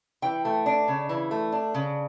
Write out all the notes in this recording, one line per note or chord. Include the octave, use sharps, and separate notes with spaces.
E3 G5
A3
D4
C#3
E3
A3
D4
C#3